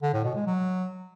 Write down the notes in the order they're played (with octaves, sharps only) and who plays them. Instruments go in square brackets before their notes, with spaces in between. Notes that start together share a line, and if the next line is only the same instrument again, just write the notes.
[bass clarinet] D3
A2
B2
G#3
F#3